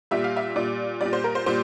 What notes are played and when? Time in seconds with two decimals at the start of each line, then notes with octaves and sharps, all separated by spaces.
0.11 A#2 G3 E5
0.24 F5
0.36 E5
0.56 A#2 G3 D5
1.01 A#2 G3 D5
1.13 C5
1.24 A#4
1.35 C5
1.46 A#2 G3 C5